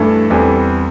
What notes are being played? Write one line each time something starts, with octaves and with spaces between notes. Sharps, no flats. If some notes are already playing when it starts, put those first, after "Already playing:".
Already playing: G2 E3 A3 D4 A4
E2 E3 G3 C4 A4